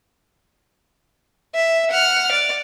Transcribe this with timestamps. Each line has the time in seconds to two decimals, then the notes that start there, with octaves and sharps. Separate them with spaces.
1.55 E5
1.91 F#5 F6
2.32 D5